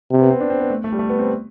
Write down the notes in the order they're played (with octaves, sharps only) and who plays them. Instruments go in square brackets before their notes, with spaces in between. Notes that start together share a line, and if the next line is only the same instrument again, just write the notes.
[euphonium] C3
[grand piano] B3
C4
D4
C4
B3
A3
A3
G3
A3
B3
C4